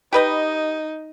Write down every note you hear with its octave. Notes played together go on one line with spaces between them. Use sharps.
D#4 G4 B4 D#5